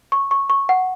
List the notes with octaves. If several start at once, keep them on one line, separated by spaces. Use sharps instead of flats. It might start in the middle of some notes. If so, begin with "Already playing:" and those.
C#6
C#6
C#6
F#5